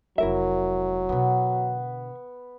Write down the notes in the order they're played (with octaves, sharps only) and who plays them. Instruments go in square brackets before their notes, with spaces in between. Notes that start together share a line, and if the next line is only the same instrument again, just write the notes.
[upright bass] F1 G#3 [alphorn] F#3 [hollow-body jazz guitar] E4 A#4 E5
[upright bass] B2 D3 [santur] B3